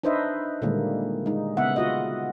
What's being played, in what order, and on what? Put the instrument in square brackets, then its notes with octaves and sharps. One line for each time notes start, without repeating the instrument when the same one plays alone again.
[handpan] D4 D#4 B4 C5 D#5 E5
A#2 D3 D#3 G3 G#3 A#3
G#3 D#4
C#3 B3 E5 F#5
F4 F#4 D#5